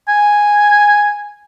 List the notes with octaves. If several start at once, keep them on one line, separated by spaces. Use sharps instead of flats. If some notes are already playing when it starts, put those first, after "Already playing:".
G#5